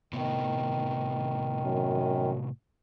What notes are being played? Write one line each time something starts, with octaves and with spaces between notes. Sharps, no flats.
A2 C3 D#3 B3
F#2